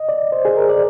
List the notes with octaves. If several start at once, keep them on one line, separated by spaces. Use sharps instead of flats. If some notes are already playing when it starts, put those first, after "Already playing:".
Already playing: D#5
D5
C5
G#4
A#4
D5